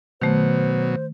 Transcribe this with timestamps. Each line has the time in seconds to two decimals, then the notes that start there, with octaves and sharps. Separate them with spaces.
0.21 B2 D#3 F#3 A3 C5